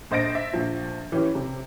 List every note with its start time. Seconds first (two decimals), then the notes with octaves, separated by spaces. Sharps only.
0.11 A#1 C5 D#5 A6 A#6 D7
0.35 E5
0.53 A#1 F3
1.12 E3 C#4 G4
1.35 C3